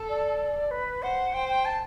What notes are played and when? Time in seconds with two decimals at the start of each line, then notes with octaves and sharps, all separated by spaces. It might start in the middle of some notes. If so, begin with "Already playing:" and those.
Already playing: A4
0.09 D5
0.71 B4
1.02 C5 F#5
1.34 C5 G5
1.49 G5
1.65 A5